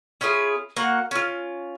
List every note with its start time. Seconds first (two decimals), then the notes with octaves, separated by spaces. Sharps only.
0.21 C#4 E4 F4 G#4
0.76 A#3 F#4 F#5
1.11 C#4 F4